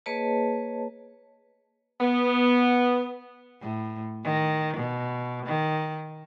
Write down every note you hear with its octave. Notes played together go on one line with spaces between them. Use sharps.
A#3 G#4 B4 C#5 D#5 A5
B3
A2
D#3
B2
D#3